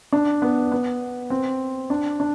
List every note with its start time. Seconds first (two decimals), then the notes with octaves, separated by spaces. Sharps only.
0.12 D4
0.42 B3
0.72 B3
1.30 C4
1.90 D4
2.20 D4